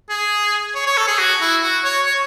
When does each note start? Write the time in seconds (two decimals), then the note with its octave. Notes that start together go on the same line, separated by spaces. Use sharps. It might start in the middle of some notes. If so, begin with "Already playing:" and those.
0.10 G#4
0.75 C#5
0.87 C#5
0.97 A4
1.08 G#4
1.19 F#4
1.41 E4
1.63 F#4
1.84 C#5
2.06 C#5